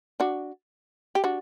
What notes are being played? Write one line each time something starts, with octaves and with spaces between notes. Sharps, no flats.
D4 F#4
G4
D4 F#4